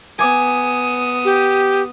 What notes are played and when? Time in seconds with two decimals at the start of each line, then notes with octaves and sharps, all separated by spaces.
0.19 B3 G#5 D6 D#6
1.25 G4